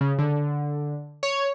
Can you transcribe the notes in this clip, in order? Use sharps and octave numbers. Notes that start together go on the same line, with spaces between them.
C#3
D3
C#5